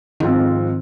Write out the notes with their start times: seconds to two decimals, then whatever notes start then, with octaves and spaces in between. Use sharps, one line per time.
0.20 G#1 G#2 D#3 F3 C4 F4